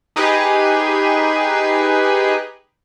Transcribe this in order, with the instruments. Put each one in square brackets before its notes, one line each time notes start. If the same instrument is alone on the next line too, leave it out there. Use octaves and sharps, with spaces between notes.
[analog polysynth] D#4 G4 G#4 B4